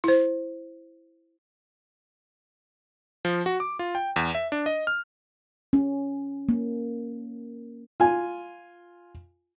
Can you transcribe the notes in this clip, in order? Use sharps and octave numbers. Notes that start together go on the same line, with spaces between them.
E4 C5
F3
F#4
D6
F4
G5
E2
E5
D4
D#5
F6
C#4
A#3
F4 G#5